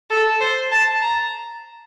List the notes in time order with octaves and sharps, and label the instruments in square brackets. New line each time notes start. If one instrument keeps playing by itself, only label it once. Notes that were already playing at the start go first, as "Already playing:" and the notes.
[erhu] A4
C5
A5
A#5